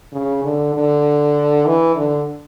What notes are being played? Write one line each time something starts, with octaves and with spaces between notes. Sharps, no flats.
C#3
D3
D3
E3
D3